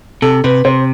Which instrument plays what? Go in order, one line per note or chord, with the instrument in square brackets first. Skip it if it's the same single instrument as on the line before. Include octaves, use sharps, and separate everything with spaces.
[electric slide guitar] C3 [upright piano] A4
[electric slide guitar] C3 [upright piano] B4
[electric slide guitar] C3 [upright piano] C5